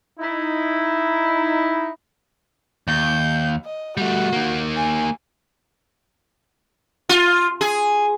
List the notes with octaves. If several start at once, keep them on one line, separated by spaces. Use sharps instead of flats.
D#4 E4
D#2 G6
D#5
G3 A3 F#4
D#3 A#3
G#5
F4
G#4